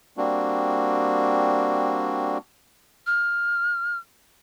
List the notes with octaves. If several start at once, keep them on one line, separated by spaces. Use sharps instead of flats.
G3 A#3 C4 D4 F#4
F6